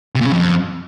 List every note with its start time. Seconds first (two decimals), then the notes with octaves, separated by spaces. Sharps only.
0.15 C3
0.21 A#2
0.26 C#3
0.32 F2